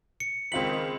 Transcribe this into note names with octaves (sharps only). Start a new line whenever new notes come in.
C#7
C#2 D#3 C4 F4 B6 F#7